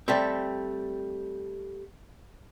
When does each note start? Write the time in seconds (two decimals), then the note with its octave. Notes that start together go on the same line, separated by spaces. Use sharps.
0.08 G3 A3 C4